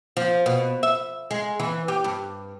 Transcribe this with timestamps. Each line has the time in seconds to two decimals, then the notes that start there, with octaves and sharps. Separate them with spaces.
0.17 F3
0.46 B2
0.83 E5
1.31 G#3
1.60 E3
1.88 G4
2.04 G2